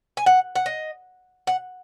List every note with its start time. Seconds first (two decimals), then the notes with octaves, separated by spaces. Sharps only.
0.17 G#5
0.26 F#5
0.55 F#5
0.66 D#5
1.47 F#5